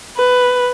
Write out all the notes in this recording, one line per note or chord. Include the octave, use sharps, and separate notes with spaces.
B4